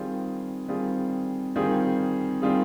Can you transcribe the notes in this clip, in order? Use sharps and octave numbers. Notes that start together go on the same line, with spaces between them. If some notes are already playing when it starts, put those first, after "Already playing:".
Already playing: D#3 G3 C4 F4 G#4
D#3 G3 C4 F4 G#4
D#3 G3 C4 F4 G#4
D#3 G3 C4 F4 G#4